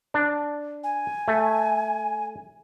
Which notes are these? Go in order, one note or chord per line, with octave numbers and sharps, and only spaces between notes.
D4
G#5
A3